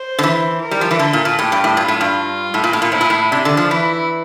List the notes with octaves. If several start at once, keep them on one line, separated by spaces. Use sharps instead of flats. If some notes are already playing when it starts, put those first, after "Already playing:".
Already playing: C5
D3
E3
A#4
G3
F3
E3
D3 A4
A#2
A#2
A2 G4
G2
A2
G2 F4
A2
G2
A2
A#2
A2
A#2
A2 E4
A#2
A2
C3 D4
D3
F3
E3 E4